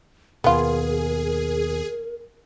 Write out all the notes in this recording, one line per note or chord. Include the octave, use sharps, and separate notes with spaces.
D#2 B2 B3 F4 G#4 A#4